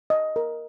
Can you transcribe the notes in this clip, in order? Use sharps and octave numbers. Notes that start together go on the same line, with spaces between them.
D#5
A#4